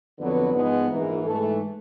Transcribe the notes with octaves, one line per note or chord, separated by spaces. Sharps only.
F2 D3 F#3 B3 B4
G#2 F3 G#3 B3
A#1 G#2 E3 A#4
G#2 E3 A3 A4